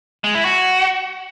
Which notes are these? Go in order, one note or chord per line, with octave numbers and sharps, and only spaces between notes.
G#3
E4
F#4